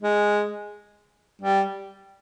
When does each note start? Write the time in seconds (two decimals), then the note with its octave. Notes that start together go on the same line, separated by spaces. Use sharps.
0.02 G#3
1.42 G3